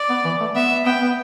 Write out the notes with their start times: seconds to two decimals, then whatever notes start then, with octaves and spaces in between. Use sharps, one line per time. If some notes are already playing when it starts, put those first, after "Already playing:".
Already playing: D5
0.09 B3
0.24 E3
0.40 A3
0.55 B3 E5
0.86 B3 G5
1.01 B3